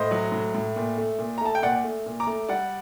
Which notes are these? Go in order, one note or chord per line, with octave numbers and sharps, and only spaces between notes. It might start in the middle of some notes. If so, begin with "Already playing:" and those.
Already playing: A2 C5 D#5
F#3
A2
A2
A#2
A3
A#2
A#5
A3 A5
G5
A#2 D5 F#5
A3
A#2
A#5 D6
A3
G3 D5 F#5